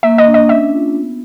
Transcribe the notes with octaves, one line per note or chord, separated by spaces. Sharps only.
A#3 E5
D#5
D4
D#5
C#4 E5
F4
B3